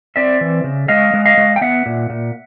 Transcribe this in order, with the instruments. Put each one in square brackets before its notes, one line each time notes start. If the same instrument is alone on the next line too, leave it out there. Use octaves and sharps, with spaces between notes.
[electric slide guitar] C4 D5 E5
E3
C#3
G#3 D#5 F5
G#3
D#5 F5
G#3
G5
B3 E5 F#5
A#2
A#2